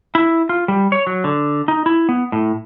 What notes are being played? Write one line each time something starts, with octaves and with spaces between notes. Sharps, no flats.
E4
F4
G3
C#5
F#3
D3
D#4
E4
B3
A2